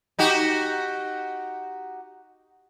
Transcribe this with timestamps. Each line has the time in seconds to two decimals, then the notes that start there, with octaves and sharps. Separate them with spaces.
0.19 D#4 F#4 G4